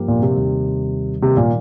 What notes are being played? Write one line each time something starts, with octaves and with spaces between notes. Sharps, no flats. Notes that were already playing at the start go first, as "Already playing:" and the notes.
Already playing: G2 F3 A#3 G4 A#4
A#2
C3
D#2 D#3 G3
C3 D#3 G3 A#3 D#4
A#2